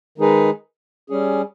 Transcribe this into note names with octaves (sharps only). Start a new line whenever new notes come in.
D#3 G#3 D#4 G#4 B4
G3 C#4 G#4